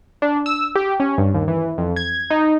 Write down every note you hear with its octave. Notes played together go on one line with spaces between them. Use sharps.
D4
E6
G4
C#4
G2
D#2
E3
F2
G#6
D#4